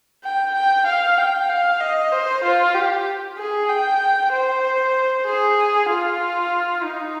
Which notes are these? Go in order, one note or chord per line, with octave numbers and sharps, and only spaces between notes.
G5
G5
F5
G5
F5
D#5
C5
F4
G4
G#4
G5
C5
G#4
F4
D#4